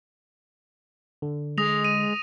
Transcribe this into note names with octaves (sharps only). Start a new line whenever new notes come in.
D3
G#3 D#6 A#6 F7
D#7